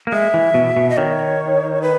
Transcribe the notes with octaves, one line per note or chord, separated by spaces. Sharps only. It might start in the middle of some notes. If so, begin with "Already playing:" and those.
A#3
G#3 E5
E3
B2
B2
D#5
D#3 C#5
B4